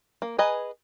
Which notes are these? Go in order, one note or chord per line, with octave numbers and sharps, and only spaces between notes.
A#3
G#4 B4 D#5 G#5 A#5